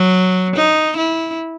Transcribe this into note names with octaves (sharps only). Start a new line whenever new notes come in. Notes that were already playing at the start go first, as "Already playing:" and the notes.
Already playing: F#3
D#4
E4